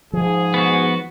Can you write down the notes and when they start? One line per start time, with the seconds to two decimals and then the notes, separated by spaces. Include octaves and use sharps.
0.13 G#2 F3 G#4
0.54 B3 F#4